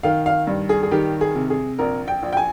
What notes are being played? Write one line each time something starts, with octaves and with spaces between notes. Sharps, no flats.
D#3 F5
F5
G2
G#4
G#4
D#3 G4
G#4
C3
G#4
A#1 A#4
G5
A#1
G5
G#5